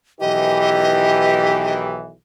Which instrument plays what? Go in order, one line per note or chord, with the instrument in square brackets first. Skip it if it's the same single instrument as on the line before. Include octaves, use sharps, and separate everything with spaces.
[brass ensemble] B1 D#3 E3 [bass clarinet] G4 [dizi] D#5